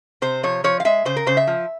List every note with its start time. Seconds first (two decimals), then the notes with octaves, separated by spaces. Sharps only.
0.22 C3 C5
0.43 F3 C#5
0.64 F3 C#5
0.80 F5
0.85 G#3 E5
1.05 C#3 C5
1.16 A#4
1.26 C#3 C5
1.37 E5
1.47 F3